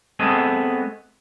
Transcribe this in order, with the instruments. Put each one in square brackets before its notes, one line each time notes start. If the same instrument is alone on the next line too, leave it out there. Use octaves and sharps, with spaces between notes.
[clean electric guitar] A3 B3 C4 G#4 D#5